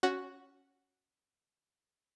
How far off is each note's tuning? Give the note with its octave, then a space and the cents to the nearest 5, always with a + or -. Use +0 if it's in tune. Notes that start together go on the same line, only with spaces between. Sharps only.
C#4 +0 F#4 +0